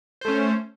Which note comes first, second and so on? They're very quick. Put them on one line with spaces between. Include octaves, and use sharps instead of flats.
C5 A3 C#4